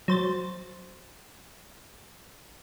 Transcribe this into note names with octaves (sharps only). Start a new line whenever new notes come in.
F#3 C5 A6